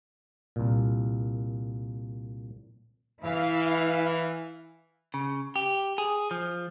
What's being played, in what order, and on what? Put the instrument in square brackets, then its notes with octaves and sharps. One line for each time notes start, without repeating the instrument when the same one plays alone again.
[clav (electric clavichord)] C2 A#2
[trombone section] E3 [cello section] E4 F5
[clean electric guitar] C#3
G4
G#4
F3